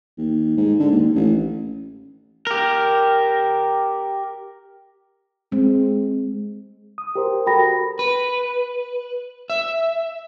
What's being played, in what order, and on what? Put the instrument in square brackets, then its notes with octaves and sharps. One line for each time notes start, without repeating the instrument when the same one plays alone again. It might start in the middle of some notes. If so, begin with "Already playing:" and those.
[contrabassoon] D#2
G#2
D3
D#2
A1
[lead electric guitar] G4 A#4
[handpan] G#3 [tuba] C4
[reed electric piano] D#6
G4 A#4 C5
[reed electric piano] F#4 A4 A#4 [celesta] G5 B5 A#6
[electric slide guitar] B4
E5